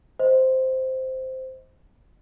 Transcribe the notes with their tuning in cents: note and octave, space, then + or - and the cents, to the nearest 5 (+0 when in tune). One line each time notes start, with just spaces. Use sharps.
C5 -5 D#5 +20